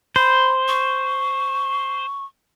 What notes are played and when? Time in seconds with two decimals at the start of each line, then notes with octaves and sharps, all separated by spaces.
0.16 C5 B5
0.68 C#6